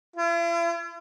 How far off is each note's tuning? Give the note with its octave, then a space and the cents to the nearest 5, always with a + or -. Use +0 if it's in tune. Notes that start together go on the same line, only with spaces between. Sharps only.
E4 +45